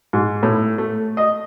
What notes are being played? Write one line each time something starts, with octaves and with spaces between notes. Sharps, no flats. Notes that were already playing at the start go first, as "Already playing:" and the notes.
G#2
A2
A3
D#5